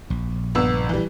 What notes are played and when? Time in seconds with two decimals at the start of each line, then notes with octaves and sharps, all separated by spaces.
0.10 A#1
0.55 G1 B3 E6
0.89 E3 G3